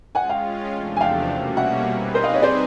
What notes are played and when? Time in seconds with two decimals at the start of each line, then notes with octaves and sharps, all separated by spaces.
0.15 G#3 C#4 F4 F#5 G#5
0.30 F5 G5
0.72 E2 C3 F3 A3 D4
0.97 G#5
1.01 F5 G5
1.29 B2 G3 A#3 C#4 F#4
1.57 E5 F#5
1.85 G3 C4 D#4 G#4 B4
2.14 A#4 C5
2.23 D#5 F5
2.33 C#5 D#5
2.42 C5 D5